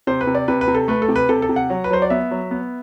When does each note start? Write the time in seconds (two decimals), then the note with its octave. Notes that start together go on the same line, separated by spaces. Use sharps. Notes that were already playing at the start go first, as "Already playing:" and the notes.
0.07 C3 C5
0.21 B4
0.27 C3
0.35 D5
0.48 C3 B4
0.61 B4
0.68 C3
0.75 A4
0.88 A3 B4
1.02 A4
1.08 C3
1.16 B4
1.29 C3 A4
1.42 A4
1.49 C3
1.56 F#5
1.70 F#3
1.84 B4
1.90 F#3 C5
2.02 D5
2.10 B3 E5
2.31 F#3
2.51 B3